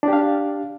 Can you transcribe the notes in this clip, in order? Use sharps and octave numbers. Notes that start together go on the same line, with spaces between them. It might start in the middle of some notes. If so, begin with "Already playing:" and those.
D4 G4 F5